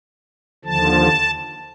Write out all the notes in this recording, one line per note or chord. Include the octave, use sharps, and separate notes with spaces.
D#2 D3 F3 A5